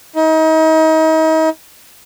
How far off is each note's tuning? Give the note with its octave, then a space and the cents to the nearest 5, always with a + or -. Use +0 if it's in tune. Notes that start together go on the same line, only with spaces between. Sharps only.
D#4 +35